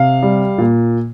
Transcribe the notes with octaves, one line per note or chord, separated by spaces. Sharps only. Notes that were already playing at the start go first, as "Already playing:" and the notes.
Already playing: C3 F5
G3
A#2